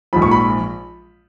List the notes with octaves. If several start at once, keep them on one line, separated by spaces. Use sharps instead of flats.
A#1 G#2 F3 B5
C#6
B5